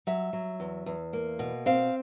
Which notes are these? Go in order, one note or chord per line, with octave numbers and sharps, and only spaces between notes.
F#3 E5
F#3
E2
E2
A#3
B2
C4 F5